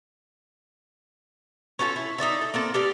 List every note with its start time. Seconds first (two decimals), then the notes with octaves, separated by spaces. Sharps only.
1.79 C#4 D4 F4 A4
1.96 E4
2.18 D#4 G4 D5 E5
2.41 A4
2.54 A#3 C4 A4
2.74 G4 A4 D5 F5